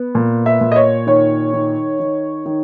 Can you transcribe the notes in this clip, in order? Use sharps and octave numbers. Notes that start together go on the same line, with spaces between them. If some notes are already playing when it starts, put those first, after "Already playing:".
Already playing: B3
A#2
E5
A#2
D#5
C#5
D#3 C#5
D#3
D#3
D#3